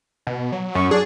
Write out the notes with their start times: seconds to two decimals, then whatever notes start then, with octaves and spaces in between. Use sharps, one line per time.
0.27 B2
0.52 F#3
0.75 F#2 C#6
0.91 D4 G#4